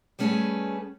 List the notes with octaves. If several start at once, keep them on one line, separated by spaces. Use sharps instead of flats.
G3 A3 C#4 F4 G#4 B4